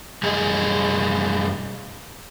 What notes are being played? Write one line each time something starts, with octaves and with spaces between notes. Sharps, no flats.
F#2 G3 G#4